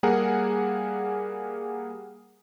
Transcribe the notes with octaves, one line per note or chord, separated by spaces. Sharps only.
G3 A#3 G#4 A#4 F#5